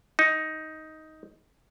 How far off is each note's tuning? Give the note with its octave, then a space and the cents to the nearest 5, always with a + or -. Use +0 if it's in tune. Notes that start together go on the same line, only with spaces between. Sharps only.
D#4 +10